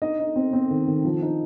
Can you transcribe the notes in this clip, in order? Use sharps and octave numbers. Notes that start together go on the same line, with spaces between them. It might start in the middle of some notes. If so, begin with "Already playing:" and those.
D#4 D#5
D#4
C4
C4
D#3
D#3
F3
D#4